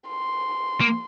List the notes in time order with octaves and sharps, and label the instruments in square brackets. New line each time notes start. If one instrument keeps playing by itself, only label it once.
[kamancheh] C6
[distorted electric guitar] A#3